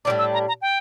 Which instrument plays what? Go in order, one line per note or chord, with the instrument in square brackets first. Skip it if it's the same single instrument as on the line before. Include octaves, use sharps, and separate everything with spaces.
[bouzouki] A2 E3 G3 D4 [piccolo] D6
[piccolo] E6
A#5
A#5
G5